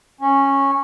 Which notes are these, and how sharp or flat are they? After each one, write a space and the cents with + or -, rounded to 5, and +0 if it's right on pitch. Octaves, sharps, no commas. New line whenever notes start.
C#4 -10